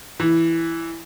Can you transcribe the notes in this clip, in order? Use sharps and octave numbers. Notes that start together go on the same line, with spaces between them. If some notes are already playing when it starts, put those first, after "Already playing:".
E3